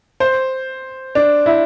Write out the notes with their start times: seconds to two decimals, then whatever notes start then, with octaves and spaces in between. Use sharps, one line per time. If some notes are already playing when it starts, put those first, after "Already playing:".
0.20 C5
1.15 D4
1.46 E4